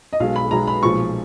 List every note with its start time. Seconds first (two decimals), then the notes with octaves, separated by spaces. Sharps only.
0.13 D#5
0.20 B1 B2 G#3 F5
0.36 B5
0.51 B1 B2 G#3 A#5
0.67 B5
0.83 B1 A#2 F3 G#3 C#6